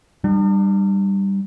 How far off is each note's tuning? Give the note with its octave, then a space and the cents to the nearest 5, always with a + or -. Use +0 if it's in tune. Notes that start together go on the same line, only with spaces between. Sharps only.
G3 +0 D4 +45